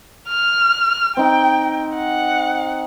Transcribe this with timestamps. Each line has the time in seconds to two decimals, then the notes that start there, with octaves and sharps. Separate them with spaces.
0.28 F6
1.17 C4 D#4 G5
1.95 F#5